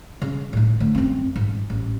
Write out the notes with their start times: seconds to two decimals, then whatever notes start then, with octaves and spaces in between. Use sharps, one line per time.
0.22 C#3
0.53 A2 D#4
0.80 D3 A3
0.95 F#2 C4
1.36 G#2
1.70 A1